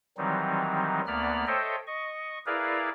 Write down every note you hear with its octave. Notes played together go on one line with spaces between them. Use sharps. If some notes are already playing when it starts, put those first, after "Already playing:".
D#3 E3 F#3 G3 C4 D#4
D2 A#3 B3 D5 B5 F6
A4 C5 C#5 D#5 E5 G5
D#5 C#6
E4 G#4 A#4 B4 D5 F5